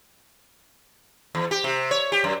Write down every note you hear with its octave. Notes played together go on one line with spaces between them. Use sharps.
E2
G4
C3
C#5
G4
F#2